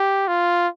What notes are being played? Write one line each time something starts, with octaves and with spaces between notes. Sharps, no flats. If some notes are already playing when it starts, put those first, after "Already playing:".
Already playing: G4
F4